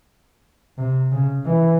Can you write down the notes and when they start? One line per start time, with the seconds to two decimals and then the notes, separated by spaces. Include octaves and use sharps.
0.78 C3
1.12 C#3
1.45 E3